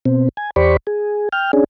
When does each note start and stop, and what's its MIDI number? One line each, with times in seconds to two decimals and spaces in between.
0.06 0.29 47
0.06 0.29 60
0.37 0.50 80
0.56 0.77 40
0.56 0.77 67
0.56 0.77 72
0.56 0.77 74
0.56 0.77 83
0.56 0.77 85
0.87 1.29 68
1.33 1.51 79
1.33 1.51 89
1.53 1.64 61
1.53 1.64 62
1.53 1.64 68